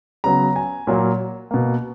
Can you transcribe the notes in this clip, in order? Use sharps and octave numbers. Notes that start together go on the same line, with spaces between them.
C#3 F#3 B3 A#5
G#5
A#2 F#3 A#3
B2 A#3